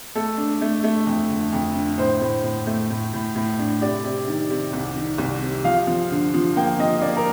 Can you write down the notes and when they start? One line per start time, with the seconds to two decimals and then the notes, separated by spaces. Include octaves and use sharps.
0.15 A3 A4
0.37 D4
0.61 A3
0.84 A3
1.07 F2
1.30 D3
1.53 F2
1.75 D3
1.98 A2 C5
2.21 A2
2.44 A2
2.67 A3
2.90 A2
3.13 A2
3.36 A2
3.59 D4
3.81 C3 D5
4.04 C3
4.28 D#3
4.50 C3
4.73 C2
4.96 D#3
5.18 C2
5.42 C3
5.64 F3 F5
5.87 F3
6.11 D3
6.34 F3
6.56 A#3 G5
6.79 F3 D#5
7.02 A#3 D5
7.17 A#4